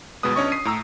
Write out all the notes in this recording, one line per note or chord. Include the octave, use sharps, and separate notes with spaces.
G1 B2 G#3 B3 B4 D#6
C#2 C#4 D4 C#5 D#5 C#6
D#6 B6 C7 D#7
A2 A#5 E6